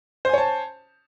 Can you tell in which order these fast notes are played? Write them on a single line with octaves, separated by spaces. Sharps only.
C5 G#5 C#5 A5